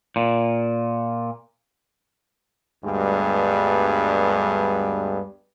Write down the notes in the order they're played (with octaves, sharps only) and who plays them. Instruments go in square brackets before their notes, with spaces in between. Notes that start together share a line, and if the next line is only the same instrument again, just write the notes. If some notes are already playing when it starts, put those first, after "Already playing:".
[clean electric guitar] A#2
[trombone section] D2 G2 G3 G#3 B3